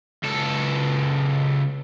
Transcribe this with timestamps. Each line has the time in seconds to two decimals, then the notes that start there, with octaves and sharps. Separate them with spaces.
0.24 C#2 A4